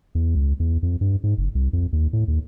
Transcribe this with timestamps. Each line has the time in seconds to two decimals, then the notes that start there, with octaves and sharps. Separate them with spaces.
0.15 E2
0.35 C#2
0.60 E2
0.83 F2
1.01 G2
1.24 G#2
1.37 F#1
1.55 C2
1.73 F2
1.93 D#2
2.13 A2
2.28 D#2